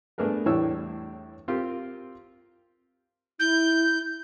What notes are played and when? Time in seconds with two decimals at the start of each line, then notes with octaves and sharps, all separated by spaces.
0.18 A3 B3 D4 G#4 A#4 B4
0.46 E2 A2 G3 D4 C#5 E6
1.48 C4 F4 G4 A#4
3.40 E4 G6